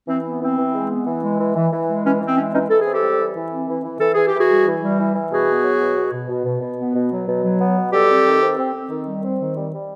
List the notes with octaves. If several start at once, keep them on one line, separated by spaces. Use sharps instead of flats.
E3 C4
B3
E3 C4
E3
G#3
B3
E3
G#3
E3
E3
E3
G#3
E3 C#4
E3
C4
G#3 C#4
E3 C#4 D#4
E3 A4
G#4
C4
G4 A4
G3
E3
E3
C4
E3
E3
E3 A4
E3 G#4
G4
E3
F#4 G#4
G3
E3
G3
E3
E3
B2 F#4 G#4
B3
F#3
B2
B2
B2
B2
B2
B2
B3
B2
F#3
B2
F#3
B3
B2
G3 G4 A4
C4
D#3
C4
C4
C4
D#3
G3
C4
D#3
G3
G3